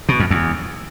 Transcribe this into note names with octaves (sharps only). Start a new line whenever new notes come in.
B2
F2
E2